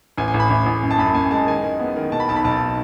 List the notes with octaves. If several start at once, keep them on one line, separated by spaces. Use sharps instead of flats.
A1 G#5
G#5
A1
B5
A1
A1
F#2
A5
F#2 B5
F#2 G#5
G#3 A5
D#3 G#5
G#3
B3
D#3
B2 A5
B5
B1 A5
B5
B1 A5